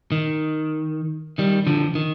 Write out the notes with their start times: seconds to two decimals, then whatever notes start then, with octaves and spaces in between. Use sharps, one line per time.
0.12 D#3
1.38 D#3 G3
1.67 D3 F3
1.95 D#3